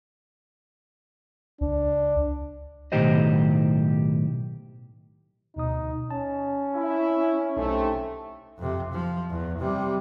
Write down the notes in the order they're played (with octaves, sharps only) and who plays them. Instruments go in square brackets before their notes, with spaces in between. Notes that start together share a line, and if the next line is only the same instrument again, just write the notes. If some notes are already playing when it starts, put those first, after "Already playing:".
[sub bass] C#2 [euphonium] D4
[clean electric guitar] B1 A2 D#3 G4 C5 D#5
[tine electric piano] D2 B2 D#6 [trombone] D#4
[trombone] C#4 [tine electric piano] A5
[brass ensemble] E4
[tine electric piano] B1 D#4 [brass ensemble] C3 A3
[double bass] F2 C3
F3
E2
C3 G3